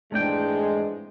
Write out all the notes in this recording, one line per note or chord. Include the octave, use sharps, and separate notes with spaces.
F2 G#2 E3 G#3 A3 D4 G5